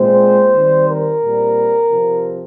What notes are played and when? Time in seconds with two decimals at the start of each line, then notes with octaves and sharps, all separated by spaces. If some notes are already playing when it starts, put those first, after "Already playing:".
Already playing: A#2 G#3 C4 C5
0.55 D#3 G3 C4
0.88 A#4
1.22 A#2 G3 C4
1.90 C3 F3 C4